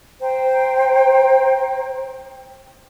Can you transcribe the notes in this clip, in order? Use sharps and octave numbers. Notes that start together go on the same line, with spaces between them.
C5 G5 A#5